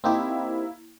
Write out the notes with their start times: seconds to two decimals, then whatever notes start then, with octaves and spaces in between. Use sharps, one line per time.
0.04 A#3 C4 D#4 E4 G4